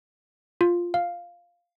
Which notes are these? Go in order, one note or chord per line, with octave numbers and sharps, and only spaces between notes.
F4
F5